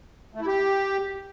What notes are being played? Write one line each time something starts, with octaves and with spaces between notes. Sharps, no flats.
A3
E4
G4